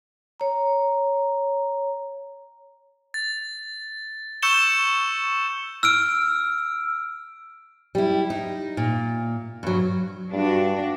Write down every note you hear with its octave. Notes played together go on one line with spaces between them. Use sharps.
C#5 A#5
A6
C#6 E6 G6 C#7 E7 G7
E6 F6 D7
G3 E4
D#4
A#2
G2 F#3
G2 D4 F#4